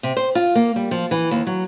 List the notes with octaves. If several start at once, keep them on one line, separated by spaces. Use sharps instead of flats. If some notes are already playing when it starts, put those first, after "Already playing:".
C3
C5
F4
A#3
G3
F3
E3
D#2
F#3